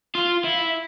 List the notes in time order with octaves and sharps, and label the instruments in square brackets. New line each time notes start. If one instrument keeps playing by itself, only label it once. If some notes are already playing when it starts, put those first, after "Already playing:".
[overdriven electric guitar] F4 [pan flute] F5
[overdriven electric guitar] E4 [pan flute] F5
[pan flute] E5